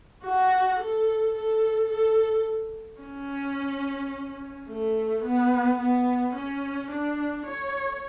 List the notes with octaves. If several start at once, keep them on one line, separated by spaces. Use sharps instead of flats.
F#4
A4
A4
A4
C#4
A3
B3
B3
C#4
D4
C#5